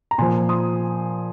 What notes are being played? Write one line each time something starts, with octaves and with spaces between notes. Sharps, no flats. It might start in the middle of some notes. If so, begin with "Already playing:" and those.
A#5
A#2 F3 G#5 C6
C6 D#6